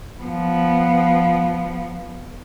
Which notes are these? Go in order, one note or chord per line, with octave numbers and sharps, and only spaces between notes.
F3 B3